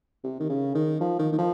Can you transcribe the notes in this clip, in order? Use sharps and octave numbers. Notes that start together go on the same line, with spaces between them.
C3
D#3
C#3
D#3
F3
D#3
D#3
F3